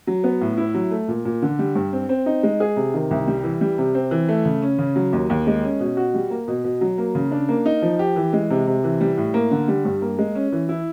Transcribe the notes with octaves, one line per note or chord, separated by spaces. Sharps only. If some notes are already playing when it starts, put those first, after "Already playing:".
F#3
B3
A2
E4
F#3
A3
A#2
A#2
D3
G3
G2
C4
C4
D#4
G#3
G#4
C3
D#3
C2
G3
E3
G3
C3
C4
E3
A3
C#3
C#4
C#3
F#3
D#2
D#2
G#3
C#4
B2
F#4
G3
A#3
B2
B2
F#3
A#3
C#3
D4
A#3
D#4
F3
G4
E3
G#3
C3
C3
E3
G3
A2
A#3
D3
G3
G2
A#3
G#3
C#4
E3
E4